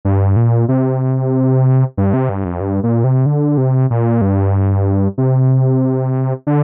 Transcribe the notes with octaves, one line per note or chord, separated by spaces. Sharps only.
G2
A#2
C3
G2
C3
G2
F2
G2
A#2
C3
D3
C3
A#2
G2
C3
D3